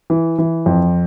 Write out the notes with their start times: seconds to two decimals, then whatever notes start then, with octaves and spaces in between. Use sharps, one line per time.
0.10 E3
0.38 E3
0.66 F2